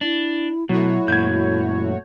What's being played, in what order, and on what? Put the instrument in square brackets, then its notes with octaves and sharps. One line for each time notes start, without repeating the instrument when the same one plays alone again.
[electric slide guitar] D4 [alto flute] E4
[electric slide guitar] B2 [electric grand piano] F#3 [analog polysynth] A3 F#4 C#5 [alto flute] E4
[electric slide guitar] F#2 A#2 [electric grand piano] G6 G#6